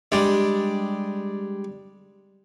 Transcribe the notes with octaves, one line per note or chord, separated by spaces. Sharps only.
G3 G#3 D4